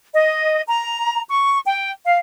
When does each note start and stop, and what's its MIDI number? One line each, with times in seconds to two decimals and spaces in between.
0.14 0.61 75
0.67 1.21 82
1.30 1.58 85
1.65 1.91 79
2.06 2.17 77